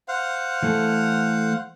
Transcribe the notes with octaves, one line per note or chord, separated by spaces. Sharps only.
C5 F5 F#5
E3 A3 A4